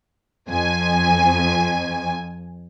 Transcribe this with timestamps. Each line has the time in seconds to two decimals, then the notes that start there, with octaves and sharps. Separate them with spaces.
0.49 F2 G#5